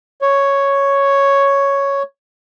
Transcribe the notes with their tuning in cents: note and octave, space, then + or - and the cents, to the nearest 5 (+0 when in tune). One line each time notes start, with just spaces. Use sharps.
C#5 +0